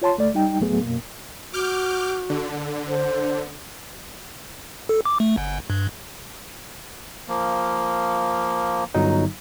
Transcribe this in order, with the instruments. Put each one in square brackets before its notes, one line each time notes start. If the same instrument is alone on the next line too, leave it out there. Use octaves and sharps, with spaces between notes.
[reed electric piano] F4 C#5 A5 C6
D2 A3 D5
G3 D#4 G5
D2 A2 F#3 A3 B3 G#4
F#2 B2 A#3
[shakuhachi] F#4 [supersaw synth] D6 F6 G6
[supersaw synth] D3
[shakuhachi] C5
[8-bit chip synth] A4
D6
A3
G1
G2
[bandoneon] F3 A#3
[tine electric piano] G1 F#3 D#4